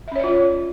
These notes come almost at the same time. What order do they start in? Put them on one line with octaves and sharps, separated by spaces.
E5 C#4 C#5 D5 F4